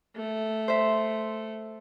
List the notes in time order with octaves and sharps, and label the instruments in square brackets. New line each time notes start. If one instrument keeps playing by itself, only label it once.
[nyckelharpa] A3
[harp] C5 E5